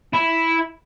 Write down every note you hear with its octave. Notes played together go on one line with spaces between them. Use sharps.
E4